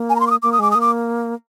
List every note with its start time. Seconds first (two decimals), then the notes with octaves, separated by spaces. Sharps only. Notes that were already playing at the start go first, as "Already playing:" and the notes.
Already playing: A#3
0.10 G#5
0.16 A#5
0.20 C6
0.27 D6
0.31 D#6
0.43 A#3 D6
0.52 D#6
0.59 G#3 D6
0.71 A#3 D#6
0.81 D6